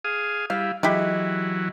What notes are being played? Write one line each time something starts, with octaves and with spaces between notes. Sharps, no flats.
G#4 F5 D#6
G3 E4 F5
E3 F#3 G#3 E4 G4